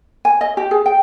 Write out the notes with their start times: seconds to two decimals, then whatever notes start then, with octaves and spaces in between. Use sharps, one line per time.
0.25 G#5
0.41 D#5
0.57 G4
0.71 G#4
0.86 G5